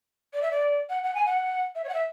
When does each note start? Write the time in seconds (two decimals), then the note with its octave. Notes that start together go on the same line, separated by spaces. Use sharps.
0.34 D5
0.42 E5
0.51 D5
0.90 F#5
1.04 F#5
1.15 G#5
1.26 F#5
1.75 E5
1.84 C#5
1.89 F#5
1.94 E5